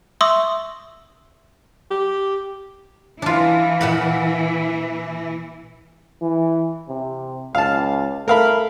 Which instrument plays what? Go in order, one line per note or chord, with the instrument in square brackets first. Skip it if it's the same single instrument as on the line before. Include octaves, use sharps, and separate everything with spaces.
[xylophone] E5 C6 C#6 D#6 E6
[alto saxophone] G4
[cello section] E3 E4 [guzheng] D4 F4
[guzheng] A#2 F#5 B5
[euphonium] E3
C3
[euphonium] C#2 [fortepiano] F5 A5
[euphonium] A3 [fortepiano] A#4 F5 B5